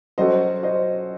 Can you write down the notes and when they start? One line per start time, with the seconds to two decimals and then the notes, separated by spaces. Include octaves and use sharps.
0.18 F#3 C#4 F#4 A4 C5 D#5
0.63 C5 D#5